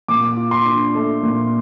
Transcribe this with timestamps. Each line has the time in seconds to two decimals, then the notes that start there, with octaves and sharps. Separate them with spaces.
0.08 A#2 D6
0.37 F4
0.51 C6
0.65 D4
0.95 A3
1.23 A#2